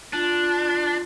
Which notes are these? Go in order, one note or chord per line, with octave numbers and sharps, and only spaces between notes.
D4 F4